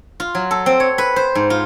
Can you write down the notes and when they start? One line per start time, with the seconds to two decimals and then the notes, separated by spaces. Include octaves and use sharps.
0.20 F4
0.35 F#3
0.51 A4
0.66 C4
0.80 C#5
0.98 B4
1.16 C5
1.35 G#2
1.50 F4